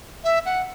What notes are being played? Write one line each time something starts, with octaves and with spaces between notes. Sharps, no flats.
E5
F#5